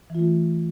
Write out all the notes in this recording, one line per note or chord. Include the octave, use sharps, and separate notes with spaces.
E3 A3 F4